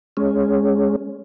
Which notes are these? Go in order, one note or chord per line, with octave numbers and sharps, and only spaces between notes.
G#3 C#4